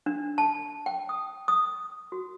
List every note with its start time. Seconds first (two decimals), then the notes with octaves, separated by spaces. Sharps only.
0.06 D4
0.38 A5
0.86 G5
1.09 D#6
1.48 D#6
2.12 F#4